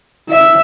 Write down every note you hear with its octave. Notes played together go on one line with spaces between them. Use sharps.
E5